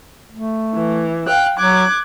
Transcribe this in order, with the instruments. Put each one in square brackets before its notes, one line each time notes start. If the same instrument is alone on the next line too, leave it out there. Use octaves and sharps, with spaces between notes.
[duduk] A3
[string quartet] E3
F5 G5 F#6
[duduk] F#3 [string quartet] D6 F#6 G#6